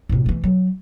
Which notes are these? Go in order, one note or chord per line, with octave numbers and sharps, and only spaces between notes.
A2 C3
E3 A3
F#3